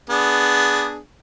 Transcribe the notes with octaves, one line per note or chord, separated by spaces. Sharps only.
B3 D4 G#4